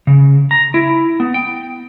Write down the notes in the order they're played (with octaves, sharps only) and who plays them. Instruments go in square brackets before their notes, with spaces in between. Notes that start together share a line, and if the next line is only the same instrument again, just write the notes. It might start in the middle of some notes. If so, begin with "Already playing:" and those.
[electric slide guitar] C#3
A#5
E4
B3
G5